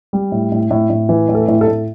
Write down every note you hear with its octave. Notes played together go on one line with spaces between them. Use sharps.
G3
A2
A2
A2
A2
E3
A2
A4
A2
A4
A2